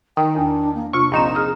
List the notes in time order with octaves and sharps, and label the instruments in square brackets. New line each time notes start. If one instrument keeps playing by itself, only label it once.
[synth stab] D#3 [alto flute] G5 [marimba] D#6
[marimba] E2 [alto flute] D4
[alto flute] A#3
[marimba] C3 F4 [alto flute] D4 [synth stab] C#6
[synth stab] A#1 D#4 E7 [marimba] F3 C4 [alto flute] A#5
[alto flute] G#4 [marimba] D#6 F6